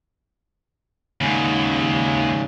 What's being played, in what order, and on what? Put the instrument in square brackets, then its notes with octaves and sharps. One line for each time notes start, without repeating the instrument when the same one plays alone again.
[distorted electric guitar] D#2 [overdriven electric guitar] G#2 C#3